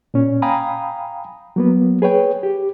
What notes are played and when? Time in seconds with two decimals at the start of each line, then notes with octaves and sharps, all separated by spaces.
0.14 A#2 C#4
0.42 F5 G5 G#5 A#5 B5 D#6
1.56 F#3 A#3 B3
2.02 G#4 B4 C#5 G5
2.43 G4